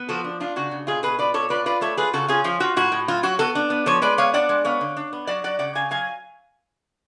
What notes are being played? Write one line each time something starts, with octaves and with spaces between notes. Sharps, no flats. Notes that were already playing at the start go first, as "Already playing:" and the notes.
Already playing: B3
F3 F#4 A4
D4
D4 F4
C#3 F#4
C#3
B2 F4 G#4
B2 G#4 B4
F4 B4 D5
B2 A4 C#5
F4 B4 D5
F4 B4 D5
A3 A4 C#5
F4 G#4 B4
C#3 F#4 A4
C#4 F4 G#4
F3 F4
F4 F#4
A2 F#4
A2
F#3 F4
F#3 F#4
B3 F#4 A4
D4
B3
F3 A4 C#5
G#3 B4 D5
B3 C#5 F5
D4 D5 F#5
G#3
B3 C#5 F5
D3
D4
B3
F#3 D5 F#5
F#3 D5 F#5
C#3 D5 F#5
C#3 F5 G#5
F#3 F5 G#5